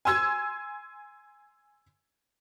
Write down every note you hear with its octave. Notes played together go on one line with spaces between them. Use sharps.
G#5 C6 E6 G#6